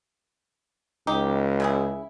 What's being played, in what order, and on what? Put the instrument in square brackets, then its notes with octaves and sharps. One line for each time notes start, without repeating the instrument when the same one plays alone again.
[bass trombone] C#2 [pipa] D#4 G4
[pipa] C#3 E4 G#4